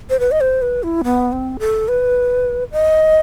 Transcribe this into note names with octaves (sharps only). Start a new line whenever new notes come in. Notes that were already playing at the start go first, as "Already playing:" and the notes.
C5
B4
D#5
C5
B4
E4
B3
C4
A4
B4
D#5